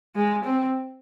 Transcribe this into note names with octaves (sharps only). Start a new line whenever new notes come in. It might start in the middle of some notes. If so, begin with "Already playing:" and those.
G#3
C4